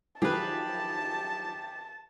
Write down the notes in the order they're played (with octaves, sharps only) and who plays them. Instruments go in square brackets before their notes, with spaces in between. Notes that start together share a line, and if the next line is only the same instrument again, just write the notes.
[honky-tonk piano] D#3 F3 F#3 [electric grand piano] G4 [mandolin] G#4 B4 [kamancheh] A5